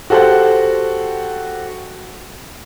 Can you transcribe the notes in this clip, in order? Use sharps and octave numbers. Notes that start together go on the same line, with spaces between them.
F#4 G4 A4 C5 F#5